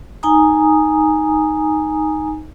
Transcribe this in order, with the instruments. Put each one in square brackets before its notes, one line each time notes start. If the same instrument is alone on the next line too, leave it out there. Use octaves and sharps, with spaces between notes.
[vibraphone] D#4 G#5 A#5 D#6